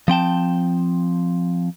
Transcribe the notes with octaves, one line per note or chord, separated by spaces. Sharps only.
F3 C4 G5 A5